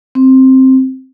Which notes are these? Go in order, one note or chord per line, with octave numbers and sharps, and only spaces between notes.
C4